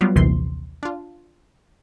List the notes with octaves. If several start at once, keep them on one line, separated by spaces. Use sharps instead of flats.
F#3 G3 B3 F4
A#1 D#2 C3 E3 C6
D4 F4